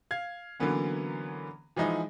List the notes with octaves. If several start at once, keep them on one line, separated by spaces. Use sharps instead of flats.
F5 G#6
D3 E3 F#3 A#3 B3 C#4
E3 F3 G#3 D#4 E4